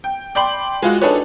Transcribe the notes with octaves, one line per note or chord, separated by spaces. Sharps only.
G5
D5 G5 B5 C6 F#7
G#3 F4 F#4
D4 D#4 G#4 A4 B4 C#5